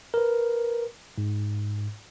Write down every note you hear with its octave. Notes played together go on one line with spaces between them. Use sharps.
A#4 B4
G#2